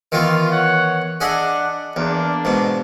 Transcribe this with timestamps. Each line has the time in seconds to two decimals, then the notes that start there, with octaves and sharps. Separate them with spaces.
0.12 D#3 E3 B3 F4
0.50 C#5 F#5
1.21 D4 G#4 D#5 E5 F#5
1.96 E2 A#3 D4
2.45 G#2 B2